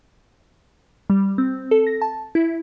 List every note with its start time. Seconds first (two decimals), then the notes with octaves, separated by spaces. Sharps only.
1.10 G3
1.38 C4
1.71 A4
1.87 A#6
2.01 A5
2.35 E4